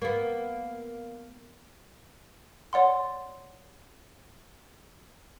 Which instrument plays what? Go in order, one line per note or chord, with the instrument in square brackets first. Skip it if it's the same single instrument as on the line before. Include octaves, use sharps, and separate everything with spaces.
[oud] A#3 B3
[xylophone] C#5 D5 F#5 C6